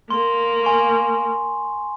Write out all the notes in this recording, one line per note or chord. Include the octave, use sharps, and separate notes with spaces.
A#3 C6
G#5 C6 C#6